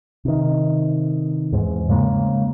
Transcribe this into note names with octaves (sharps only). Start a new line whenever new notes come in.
C3 D#3
E2 G#2
C#3 G#3 A#3